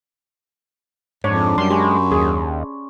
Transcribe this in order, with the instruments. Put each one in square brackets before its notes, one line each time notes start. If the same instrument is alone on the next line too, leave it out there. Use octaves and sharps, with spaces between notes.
[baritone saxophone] F2 [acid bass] G#2 [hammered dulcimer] D4 [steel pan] C#5
[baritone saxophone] F#2 [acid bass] G3 [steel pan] C6
[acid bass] G#3 [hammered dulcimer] C#4 B5 C6 [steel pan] G4
[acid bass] D#2 [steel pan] G#4